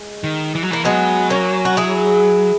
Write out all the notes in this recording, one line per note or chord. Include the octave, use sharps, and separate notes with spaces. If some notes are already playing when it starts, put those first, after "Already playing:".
Already playing: G#3
D#3
E3
F#3
E3 A#3
F#3 G#3 B3
A#3 C#4
F#4
E4 G#4